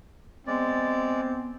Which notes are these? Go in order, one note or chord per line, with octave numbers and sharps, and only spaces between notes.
G#3 B3 C4 D5